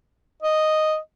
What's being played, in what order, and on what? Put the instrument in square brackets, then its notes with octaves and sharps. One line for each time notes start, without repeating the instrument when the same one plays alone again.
[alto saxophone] D#5